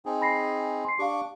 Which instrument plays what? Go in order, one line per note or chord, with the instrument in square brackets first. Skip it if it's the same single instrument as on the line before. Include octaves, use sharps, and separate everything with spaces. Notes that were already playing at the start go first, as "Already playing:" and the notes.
[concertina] C4 D#4 G#4
[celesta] B5 A#6 C7
C6 C7
[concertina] D4 C#6 D6 [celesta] G4 F5